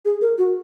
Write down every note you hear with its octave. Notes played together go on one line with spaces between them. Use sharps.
G#4
A#4
F#4